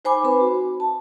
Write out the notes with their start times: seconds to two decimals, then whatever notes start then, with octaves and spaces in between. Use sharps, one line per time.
0.05 D#4 C5 G#5 B5 D6
0.24 C4 B4 B5
0.40 F#4
0.80 A5